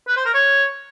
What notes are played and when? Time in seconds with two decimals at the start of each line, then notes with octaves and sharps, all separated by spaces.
0.08 B4
0.17 C5
0.26 A#4
0.34 C#5